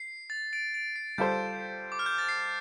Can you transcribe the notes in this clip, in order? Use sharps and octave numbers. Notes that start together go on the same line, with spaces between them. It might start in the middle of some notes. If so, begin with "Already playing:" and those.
Already playing: C7
A6
A6 D7
A6 D7
C7
G3 F4 A4 C5 G6
D6
F6
G6
A6
C7